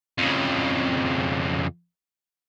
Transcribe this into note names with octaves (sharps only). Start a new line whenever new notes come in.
F2 C#3